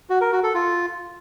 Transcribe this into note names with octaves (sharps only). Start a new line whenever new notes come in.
F#4
A#4
F#4
A4
F4